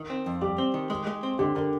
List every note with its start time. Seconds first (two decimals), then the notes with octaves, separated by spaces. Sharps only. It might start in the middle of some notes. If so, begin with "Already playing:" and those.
Already playing: D#3
0.10 C4
0.26 F2
0.41 G3 G4
0.58 C4
0.74 D#3
0.90 G#3
1.07 G#3
1.23 C4
1.39 D3 G4
1.55 D3 A#4